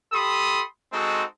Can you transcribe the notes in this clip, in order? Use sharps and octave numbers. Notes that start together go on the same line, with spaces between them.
G4 A4 B5 C6 D#6
G#3 C4 D#4 F#4 A4